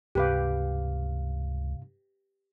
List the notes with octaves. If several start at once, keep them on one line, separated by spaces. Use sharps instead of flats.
C#2 G2 C3 G4 B4 F5